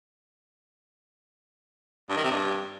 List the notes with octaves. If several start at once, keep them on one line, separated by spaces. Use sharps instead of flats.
G2
D#3
C3
G2